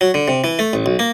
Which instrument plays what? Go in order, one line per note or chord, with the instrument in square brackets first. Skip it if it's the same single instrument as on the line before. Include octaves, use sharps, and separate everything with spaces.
[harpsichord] F#3
D3
C3
E3
A3
A1
B1
A#3